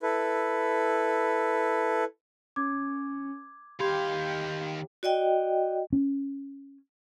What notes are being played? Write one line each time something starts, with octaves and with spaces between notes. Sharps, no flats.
E4 A4 B4
C#4 D6 G#6
D#2 G4 F5 B5 C6 G6 G#6
F#4 D5 D#5 G5
C#4